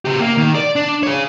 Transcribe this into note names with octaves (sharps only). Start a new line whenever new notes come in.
C#3 G4
A#3
D#3
D5
D4
G#4 C#5